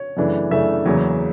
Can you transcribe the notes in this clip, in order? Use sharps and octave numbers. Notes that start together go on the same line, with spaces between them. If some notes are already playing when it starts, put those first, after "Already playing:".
Already playing: C#5
F#2 C#3 E3 A3 D4
F#2 C#3 E3 A3 D4 E5
E2 C#3 F#3 A#3